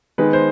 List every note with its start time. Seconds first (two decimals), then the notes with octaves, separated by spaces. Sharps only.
0.18 D#3 G#3 B3 B4
0.33 C5